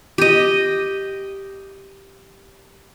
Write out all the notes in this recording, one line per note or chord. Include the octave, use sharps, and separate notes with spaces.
G4 D#5